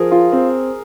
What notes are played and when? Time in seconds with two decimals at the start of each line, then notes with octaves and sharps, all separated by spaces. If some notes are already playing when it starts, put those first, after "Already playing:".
Already playing: F3 G#4 A#4
0.11 F4
0.32 C4